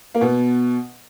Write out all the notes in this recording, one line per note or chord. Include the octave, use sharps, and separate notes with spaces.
A#3
B2 B3